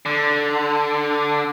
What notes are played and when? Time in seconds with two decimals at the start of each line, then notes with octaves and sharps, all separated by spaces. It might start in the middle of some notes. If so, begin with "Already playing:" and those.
0.06 D3